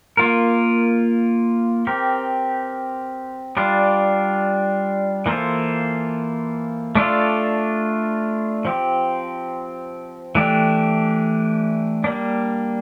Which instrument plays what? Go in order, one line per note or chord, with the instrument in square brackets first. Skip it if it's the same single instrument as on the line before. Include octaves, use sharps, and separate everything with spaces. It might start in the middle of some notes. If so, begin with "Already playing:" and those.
[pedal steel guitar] A#3 F4 A#4
C4 G4 A#4
G3 D4 F4
E3 A#3 F4 A4 C5
A3 D4 F4 A4
F3 C4 G4
E3 A3 D4 G4
G3 A#3 D4